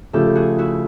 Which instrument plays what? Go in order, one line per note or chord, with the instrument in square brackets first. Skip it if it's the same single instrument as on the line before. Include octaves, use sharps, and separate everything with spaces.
[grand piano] C#3 F3 A3 [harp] G4 A4
[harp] F#4 G#4
E4 F#4